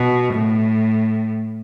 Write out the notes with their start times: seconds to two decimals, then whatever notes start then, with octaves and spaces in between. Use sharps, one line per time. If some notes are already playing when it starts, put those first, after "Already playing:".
Already playing: B2
0.33 A2